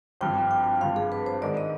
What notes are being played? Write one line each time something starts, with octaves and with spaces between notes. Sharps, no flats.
G#1 G2 F3 G5
G5
G#1 G2 F3 F5
G#4
B4
C5
G#2 D#3 G#3 D4 D5
D#5